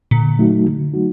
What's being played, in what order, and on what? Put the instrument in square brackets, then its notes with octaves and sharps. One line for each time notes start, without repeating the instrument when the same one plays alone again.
[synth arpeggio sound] A#2 [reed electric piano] D3
[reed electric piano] F#3 A3 D#4 F#4
D3
F#3 A3 D#4 F#4